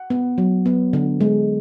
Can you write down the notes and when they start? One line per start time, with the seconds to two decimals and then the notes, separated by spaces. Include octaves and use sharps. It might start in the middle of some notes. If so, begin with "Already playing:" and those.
Already playing: F#5
0.10 B3
0.38 F#3
0.66 B3
0.93 D3
1.21 G#3